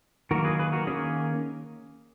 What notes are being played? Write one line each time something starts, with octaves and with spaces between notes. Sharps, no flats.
D#3 F#3 A#3 F#4 A#4
G#4 B4
G#4 B4
F#4 A#4
D#3 A#3 C#4 G#4